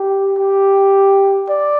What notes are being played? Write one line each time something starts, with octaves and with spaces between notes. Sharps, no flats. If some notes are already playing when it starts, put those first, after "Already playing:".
Already playing: G4
G4
D5